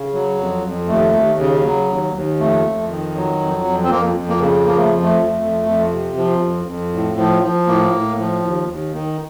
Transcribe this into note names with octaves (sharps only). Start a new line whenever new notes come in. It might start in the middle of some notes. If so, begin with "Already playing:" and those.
Already playing: C#3
F#3
F2
F2
D#2 A3
D#2
C#3
F#3
D#2
D#2
F2 A3
F2
D#3
F#3
F2
F2
C4
F2 A#3
F2
A#3
C#3
F3 A#3
A3
F2
A3
F2
F2
F2
C3
F3
F2
F2
A2
F3
F3
A2 A#3
A2
F3
D#2
D#2
D#3